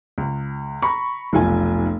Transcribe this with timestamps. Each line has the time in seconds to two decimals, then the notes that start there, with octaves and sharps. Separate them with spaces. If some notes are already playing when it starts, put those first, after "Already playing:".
0.18 C#2
0.82 A#5 B5 C#6
1.33 F1 B1 F4 G#5